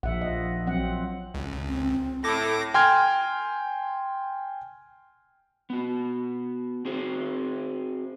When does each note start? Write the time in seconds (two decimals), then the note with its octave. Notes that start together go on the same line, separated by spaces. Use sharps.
0.03 A#1 F3 E5 F#5
0.21 D#5
0.67 F#3 C4 F#5
1.34 C#2
1.67 C4
2.24 A2 A4 D6 A#6
2.74 G5 G#5 C6 F6 G#6
5.70 B3 F#4
6.85 C4 F#4 G#4 C5